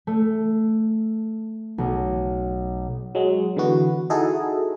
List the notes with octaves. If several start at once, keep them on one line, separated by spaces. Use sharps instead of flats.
A3
B1
F#3 G#3
D3 E3 B3 F#4
D#4 E4 F#4 G#4 A4 D#5